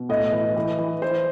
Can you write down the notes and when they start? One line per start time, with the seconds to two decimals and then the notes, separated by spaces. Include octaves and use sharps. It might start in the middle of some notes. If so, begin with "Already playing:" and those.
Already playing: B2
0.09 A2 D#5
0.32 E3
0.56 E3
0.78 E3
1.02 E3 C5